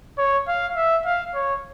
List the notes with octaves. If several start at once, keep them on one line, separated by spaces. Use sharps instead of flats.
C#5
F5
E5
F5
C#5